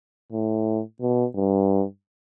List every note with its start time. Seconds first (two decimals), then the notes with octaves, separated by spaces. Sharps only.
0.32 A2
1.01 B2
1.35 G2